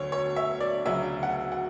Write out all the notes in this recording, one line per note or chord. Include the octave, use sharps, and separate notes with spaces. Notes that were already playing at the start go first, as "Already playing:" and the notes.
Already playing: D2 D3 F#3 A3 C#5
C#5
E5
D5
D2 C#3 F#3 E5
F#5
F#5